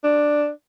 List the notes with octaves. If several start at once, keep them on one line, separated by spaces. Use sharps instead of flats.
D4